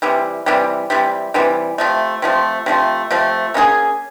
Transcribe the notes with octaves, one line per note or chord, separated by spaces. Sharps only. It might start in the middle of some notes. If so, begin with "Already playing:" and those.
C3 E3 G3
C3 E3 G3
C3 E3 G3
C3 E3 G3
C3 F3 A3
C3 F3 A3
C3 F3 A3
C3 F3 A3
A#3 C#4 F4 G#4